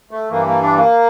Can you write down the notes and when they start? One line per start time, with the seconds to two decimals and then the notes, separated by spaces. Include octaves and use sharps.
0.11 A3
0.31 G2 E3 A#3
0.46 A#3
0.61 D4
0.77 A#3